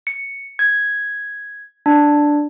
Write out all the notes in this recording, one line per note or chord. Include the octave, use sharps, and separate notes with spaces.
C#7
G#6
D4